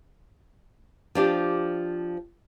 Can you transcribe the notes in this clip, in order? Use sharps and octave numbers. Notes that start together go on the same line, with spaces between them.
F3 D4 G4